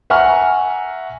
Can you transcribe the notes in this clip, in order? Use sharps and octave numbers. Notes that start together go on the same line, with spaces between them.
E5 F#5 G#5 A#5 C#6 F6